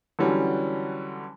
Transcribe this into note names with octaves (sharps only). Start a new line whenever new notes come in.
D3 E3 F#3 G3 C#4